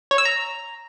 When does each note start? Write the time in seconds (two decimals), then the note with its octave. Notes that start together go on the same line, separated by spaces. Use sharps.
0.11 C#5
0.18 E6
0.25 A#5